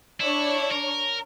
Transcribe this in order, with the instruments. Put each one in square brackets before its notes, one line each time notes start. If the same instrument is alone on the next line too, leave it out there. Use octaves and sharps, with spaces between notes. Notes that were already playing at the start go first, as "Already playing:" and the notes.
[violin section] D4 C#5 [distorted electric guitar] E4
[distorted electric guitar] A#4